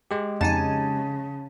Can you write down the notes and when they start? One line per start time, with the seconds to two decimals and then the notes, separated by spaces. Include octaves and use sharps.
0.11 G#3 G4
0.41 F2 C#3 D#4 G#5 A5